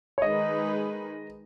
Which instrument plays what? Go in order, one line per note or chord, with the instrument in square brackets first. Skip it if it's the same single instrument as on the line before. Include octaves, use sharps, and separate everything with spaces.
[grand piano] C#5
[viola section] D#3 G#3 D#4 G#4 B4 [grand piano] D#5